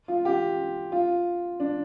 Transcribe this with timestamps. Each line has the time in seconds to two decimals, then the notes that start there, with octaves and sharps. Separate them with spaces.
0.08 F4
0.25 G4
0.92 F4
1.60 D4